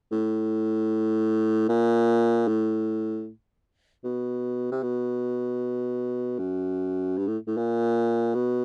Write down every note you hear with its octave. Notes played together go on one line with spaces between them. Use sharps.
A2
A#2
A2
B2
C3
B2
F#2
G2
A2
A2
A#2
B2